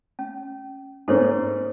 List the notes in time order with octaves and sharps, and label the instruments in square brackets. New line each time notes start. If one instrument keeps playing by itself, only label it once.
[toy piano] C#4
[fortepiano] G#2 A#3 C#4 [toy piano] A4 C5 C#5